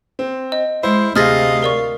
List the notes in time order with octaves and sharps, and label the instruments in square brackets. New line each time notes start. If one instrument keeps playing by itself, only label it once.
[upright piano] C4
[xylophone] D#5
[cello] G#3 [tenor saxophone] E4 [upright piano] C5
[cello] D2 F5 [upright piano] C3 G#4 [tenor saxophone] D#5 [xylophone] F6 A6 A#6
[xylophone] A#4 D5 C#6